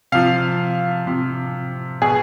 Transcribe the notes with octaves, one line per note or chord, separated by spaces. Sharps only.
C3 F3 F5
C3 F3
B2 G#4